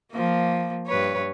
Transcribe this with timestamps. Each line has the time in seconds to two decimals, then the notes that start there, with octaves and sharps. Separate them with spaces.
0.12 F3 A#3
0.87 G2 B4 C#5